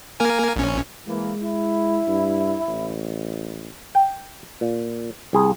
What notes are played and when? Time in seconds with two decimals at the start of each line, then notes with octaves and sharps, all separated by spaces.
0.20 A#3 A#4 G#5
0.56 A#1 C#4
1.07 E3 G#3 A#3
1.41 E4
2.07 G2
2.68 A1
3.95 G5
4.61 A#2
5.33 C2 G#4